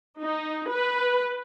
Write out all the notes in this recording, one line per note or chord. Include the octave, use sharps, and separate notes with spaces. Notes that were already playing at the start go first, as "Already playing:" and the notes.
D#4
B4